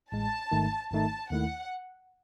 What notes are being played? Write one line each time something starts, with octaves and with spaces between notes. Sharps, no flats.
A1 A2 G#3 A5
G#1 G#2 D#3 A3 D#4
G#1 G#2 D#3 A3 D#4 A5
D#2 D#3 A3 E4 F#5